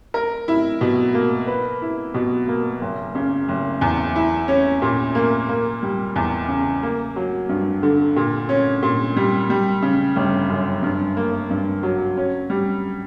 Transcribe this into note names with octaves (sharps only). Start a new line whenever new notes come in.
A#4
E4
B2
A#3
B4
E4
B2
A#3
F#1
C#3
F#1
E2
E4
C#4
A#2
A#3
A#3
G3
E2
C#3
A#3
F#3
G2
D3
A#2
C#4
A#2
G3
G3
C#3
G1
F#2
G2
A#3
G2
F#3
C#4
G3